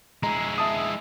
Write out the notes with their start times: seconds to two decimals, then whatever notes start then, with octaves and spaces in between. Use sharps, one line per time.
0.23 G#3 E4 A#5
0.58 E5 A5 D#6